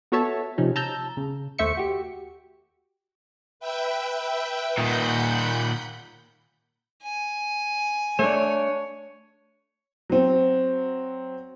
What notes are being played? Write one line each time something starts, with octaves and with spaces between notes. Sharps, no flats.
B3 F#4 A4 C#5 E5 A5
C3 F3 C#4 D#4
A5 A#5 E6 G6
C#3
D#2 A3 C5 E5 C#6 C#7
F#4 G4
B4 E5 G5
A#2 D#3 F#5 B5 G6
G#5
A3 D4 C#5
F#3 C4